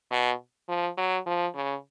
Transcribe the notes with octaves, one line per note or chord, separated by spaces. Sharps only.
B2
F3
F#3
F3
C#3